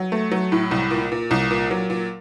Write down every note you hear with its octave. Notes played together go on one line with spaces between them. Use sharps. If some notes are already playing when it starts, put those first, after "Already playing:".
Already playing: F#3
A3
F#3
A2
C2
A#2
A#2
C2
A#2
F#3
A#2